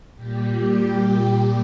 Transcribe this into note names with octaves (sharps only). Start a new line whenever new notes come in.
A#2 G3 G4